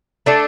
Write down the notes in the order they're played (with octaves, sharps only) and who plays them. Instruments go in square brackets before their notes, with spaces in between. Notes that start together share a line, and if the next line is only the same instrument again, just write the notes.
[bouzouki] A3 D4 A4